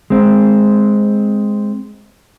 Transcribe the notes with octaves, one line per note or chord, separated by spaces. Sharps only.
G#3 C4